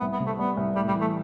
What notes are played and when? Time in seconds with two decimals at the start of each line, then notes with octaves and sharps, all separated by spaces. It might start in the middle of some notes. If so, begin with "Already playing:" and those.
0.01 C2 B3
0.13 B3
0.20 C3
0.26 A3
0.39 G3 B3
0.57 C2
0.76 A2 G3
0.88 G3
0.95 E3
1.01 A3